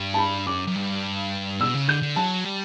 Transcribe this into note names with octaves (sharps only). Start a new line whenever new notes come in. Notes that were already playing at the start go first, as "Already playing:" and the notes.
Already playing: G2
A5
B5
F#2 D6
F#2
G2
B2 E6
C#3
D3 G6
D3
F#3 A5
G3